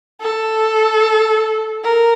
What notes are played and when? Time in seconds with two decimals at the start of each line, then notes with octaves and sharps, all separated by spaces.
0.21 A4
1.84 A#4